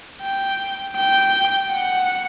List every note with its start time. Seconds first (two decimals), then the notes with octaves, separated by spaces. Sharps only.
0.21 G5
0.96 G5
1.72 F#5